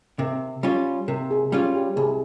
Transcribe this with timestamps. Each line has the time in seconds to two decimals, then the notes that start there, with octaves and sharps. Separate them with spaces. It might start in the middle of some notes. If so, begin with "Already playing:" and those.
0.19 C3 A#4
0.63 G3 C#4 F4
1.08 C3 A#4
1.31 G#4
1.52 G3 C#4 F4 G4
1.75 G4
1.96 C2 G#4